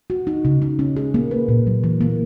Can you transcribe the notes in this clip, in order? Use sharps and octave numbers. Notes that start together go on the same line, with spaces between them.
F#4
D#4
C#3
D#4
C#4
G#4
A#3
B4
A#2
F#3
E3
A#3